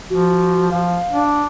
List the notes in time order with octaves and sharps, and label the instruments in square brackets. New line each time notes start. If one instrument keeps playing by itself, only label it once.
[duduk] F3 [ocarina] F#4
[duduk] F3 [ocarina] F5
[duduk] D4